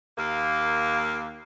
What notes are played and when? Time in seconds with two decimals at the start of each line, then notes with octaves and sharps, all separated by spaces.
0.18 D#2 A#3